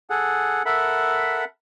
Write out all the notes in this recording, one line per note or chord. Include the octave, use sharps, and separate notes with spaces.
G#4 A4 F#5
A4 A#4 E5 F#5 B5